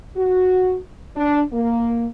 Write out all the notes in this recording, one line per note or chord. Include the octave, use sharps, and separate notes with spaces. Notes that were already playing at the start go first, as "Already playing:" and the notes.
F#4
D4
A#3